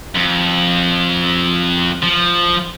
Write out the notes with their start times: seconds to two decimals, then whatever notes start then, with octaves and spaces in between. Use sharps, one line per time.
0.16 F2
2.02 F3